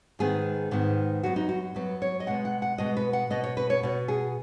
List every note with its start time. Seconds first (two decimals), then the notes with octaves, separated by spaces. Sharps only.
0.19 G#2 D#3 B3 G#4
0.71 G#2 D#3 B3
1.23 F#2 F#3 B3 F#4
1.36 D#4
1.49 F#4
1.75 F#2 F#3 B3 B4
2.02 C#5
2.20 D#5
2.27 B2 G#3 B3 F#5
2.45 F#5
2.62 F#5
2.78 B2 G#3 B3 D#5
2.97 B4
3.13 F#5
3.30 B2 B3 D#5
3.44 C#5
3.57 B4
3.70 C#5
3.83 B2 B3
4.08 G#4